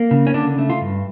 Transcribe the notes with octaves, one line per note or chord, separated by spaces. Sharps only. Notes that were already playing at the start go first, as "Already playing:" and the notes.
Already playing: A#3
C#3
C#4
D3 D4
A3
F4
G2